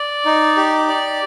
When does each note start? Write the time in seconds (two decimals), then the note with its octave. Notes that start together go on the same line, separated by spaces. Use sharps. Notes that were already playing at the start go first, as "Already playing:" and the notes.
Already playing: D5
0.25 D#4
0.57 G4
0.88 D5